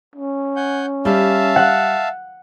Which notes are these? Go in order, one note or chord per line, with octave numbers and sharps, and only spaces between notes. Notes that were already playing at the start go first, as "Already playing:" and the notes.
C#4
F#5 G#5 G6
G3 E5 F5 A5
F#5